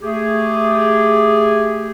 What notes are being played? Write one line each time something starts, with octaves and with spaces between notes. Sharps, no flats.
A3 G4 G#4